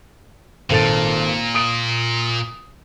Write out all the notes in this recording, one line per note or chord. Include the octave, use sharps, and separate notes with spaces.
G#1 A#2 A4 A6
D#6 D7 F#7